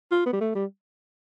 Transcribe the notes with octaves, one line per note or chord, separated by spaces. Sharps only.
F4
B3
G3
A3
G3